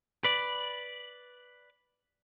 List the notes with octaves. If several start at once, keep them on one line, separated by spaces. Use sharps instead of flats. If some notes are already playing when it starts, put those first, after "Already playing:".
B4 D5